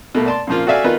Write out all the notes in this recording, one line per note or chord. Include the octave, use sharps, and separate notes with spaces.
B2 A3 A#3
D5 A5 C6
A#2 C#3 F3 A#3 F4
F#4 A4 D5 E5 F5 G#5
D#3 B3 D#4 F4 B4